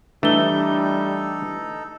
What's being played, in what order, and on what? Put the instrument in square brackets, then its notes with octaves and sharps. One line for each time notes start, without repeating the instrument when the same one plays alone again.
[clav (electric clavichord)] E3 A3 [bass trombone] G3 [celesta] D4 G7 [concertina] D#4 A4